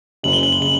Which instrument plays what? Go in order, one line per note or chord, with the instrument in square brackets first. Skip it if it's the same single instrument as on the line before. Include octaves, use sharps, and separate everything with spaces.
[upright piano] F#1 F#2 C#3 [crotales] F#7
[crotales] G7
F#7
G7
[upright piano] C#3 [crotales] F#7